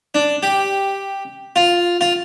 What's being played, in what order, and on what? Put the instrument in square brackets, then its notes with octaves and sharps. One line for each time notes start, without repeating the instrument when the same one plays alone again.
[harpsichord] D4
G4
F4
F4